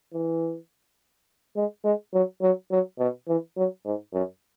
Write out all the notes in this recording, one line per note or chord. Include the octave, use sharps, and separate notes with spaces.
E3
G#3
G#3
F#3
F#3
F#3
B2
E3
F#3
G#2
F#2